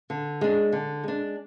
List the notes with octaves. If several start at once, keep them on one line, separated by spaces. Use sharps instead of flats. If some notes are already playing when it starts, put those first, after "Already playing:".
D3
G#3 D4
D3
G#3 D4